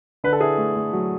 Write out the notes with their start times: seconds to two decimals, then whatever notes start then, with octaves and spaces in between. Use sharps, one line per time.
0.24 D3 B4
0.33 A4
0.41 E4 G#4
0.58 A3
0.76 A3
0.93 F#3